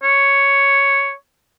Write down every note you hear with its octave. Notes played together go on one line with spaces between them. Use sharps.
C#5